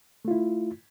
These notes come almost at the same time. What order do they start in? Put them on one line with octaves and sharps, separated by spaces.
A3 F4 E4